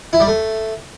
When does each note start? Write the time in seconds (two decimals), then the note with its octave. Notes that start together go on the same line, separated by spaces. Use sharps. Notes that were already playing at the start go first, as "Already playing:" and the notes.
0.13 E4
0.20 G3
0.27 A3